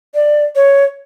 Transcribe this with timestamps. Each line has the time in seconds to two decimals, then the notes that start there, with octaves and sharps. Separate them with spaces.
0.15 D5
0.56 C#5